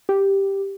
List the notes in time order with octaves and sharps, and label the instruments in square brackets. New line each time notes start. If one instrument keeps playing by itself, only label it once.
[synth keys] G4